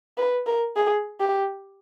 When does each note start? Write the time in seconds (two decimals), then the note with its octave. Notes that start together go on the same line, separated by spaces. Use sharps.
0.17 B4
0.47 A#4
0.76 G#4
1.20 G4